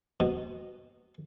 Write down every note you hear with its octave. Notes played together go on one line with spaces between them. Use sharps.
B2